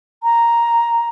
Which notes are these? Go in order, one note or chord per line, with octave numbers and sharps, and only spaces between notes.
A#5